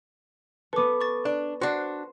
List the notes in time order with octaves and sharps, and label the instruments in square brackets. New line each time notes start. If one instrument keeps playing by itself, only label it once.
[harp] B3 A4 [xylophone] B4 D6
[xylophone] C#6 A6
[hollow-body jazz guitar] D4
[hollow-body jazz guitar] D4 F#4 [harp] C5